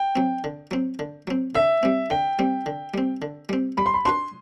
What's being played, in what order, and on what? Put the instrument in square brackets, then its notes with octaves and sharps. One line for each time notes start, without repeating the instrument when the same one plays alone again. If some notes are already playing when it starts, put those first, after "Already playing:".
Already playing: [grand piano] G5
[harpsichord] F#3 C4
D3
F#3 C4
D3
F#3 C4
[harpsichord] D3 [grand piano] E5
[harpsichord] G3 C4
[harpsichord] D3 [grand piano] G5
[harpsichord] G3 C4
D3
G3 C4
D3
G3 C4
[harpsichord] G3 [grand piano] B5
[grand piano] C6
B5
[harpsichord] D4 F#4 B4 [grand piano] C6